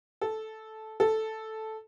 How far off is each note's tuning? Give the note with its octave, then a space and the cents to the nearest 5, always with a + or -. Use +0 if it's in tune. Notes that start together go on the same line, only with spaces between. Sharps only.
A4 -10
A4 -5